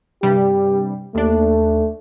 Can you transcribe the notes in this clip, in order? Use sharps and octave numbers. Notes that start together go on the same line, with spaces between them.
G2 C3 G3 G4
D#2 A3 D4